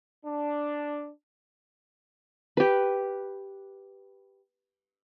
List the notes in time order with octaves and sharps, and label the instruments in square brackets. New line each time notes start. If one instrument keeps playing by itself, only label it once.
[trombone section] D4
[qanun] G4 B4